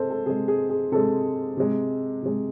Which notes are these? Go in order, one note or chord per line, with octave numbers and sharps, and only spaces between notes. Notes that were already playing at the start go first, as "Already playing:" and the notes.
Already playing: C3 G#3 A4 C5
A4
C3 G#3 G#4
G#4
G#4
C3 G#3 A4
C3 G#3
C3 G#3